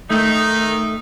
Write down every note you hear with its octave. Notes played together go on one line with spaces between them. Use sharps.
D#3 A3 D#4